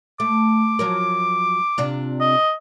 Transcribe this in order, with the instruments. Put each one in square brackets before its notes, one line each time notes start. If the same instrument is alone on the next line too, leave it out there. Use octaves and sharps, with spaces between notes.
[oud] A3 [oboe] D6
[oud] F3 F#3 A#4
C3 D4 F4
[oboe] D#5